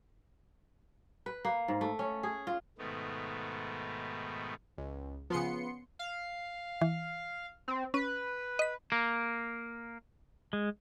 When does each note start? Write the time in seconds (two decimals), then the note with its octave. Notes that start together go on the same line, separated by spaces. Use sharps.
1.26 B4
1.45 A#3
1.68 G#2
1.81 A3
1.99 C#4
2.23 G#4
2.47 F4
2.78 G#2 B2 D#3 A3 B3
4.78 C#2
5.30 C#3 F3 B3 C6 C#7
5.99 F5
6.81 E3
7.68 C4
7.94 C#4 B4
8.59 D#5 B6
8.92 A#3
10.53 G#3